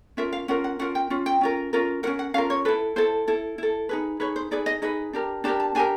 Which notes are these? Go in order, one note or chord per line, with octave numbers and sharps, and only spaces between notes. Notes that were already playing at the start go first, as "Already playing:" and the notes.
C#4 F4 A#4 E5
F5
C#4 F4 A#4 F#5
F#5
C#4 F4 A#4 F#5
G5
C#4 F4
G5
C#4 F4 A#4
C#4 F4 A#4
C#4 F4 A#4 F#5
F#5
C#4 F4 A#4 F5
C#5
E4 A4 B4
E4 A4 C5
E4 A4
E4 A4
D#4 G#4 B4
D#4 G#4 B4 C#5
C5
D#4 G#4 B4 D5
D#5
D#4 G#4 B4 D#5
D4 G4 A#4
D4 G4 A#4 A5
A5
D4 G4 A#4 G#5